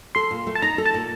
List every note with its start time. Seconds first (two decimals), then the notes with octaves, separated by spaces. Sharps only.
0.15 A4 C6
0.31 A#2
0.47 A3
0.55 A5
0.62 D#4 A#5
0.78 A4
0.86 A5
0.94 A#2